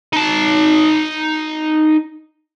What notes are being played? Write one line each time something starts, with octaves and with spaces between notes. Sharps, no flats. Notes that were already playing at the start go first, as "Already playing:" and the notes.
D#4 A5